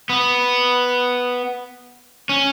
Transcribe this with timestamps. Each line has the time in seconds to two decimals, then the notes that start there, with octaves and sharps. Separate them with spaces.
0.09 B3
2.29 C#4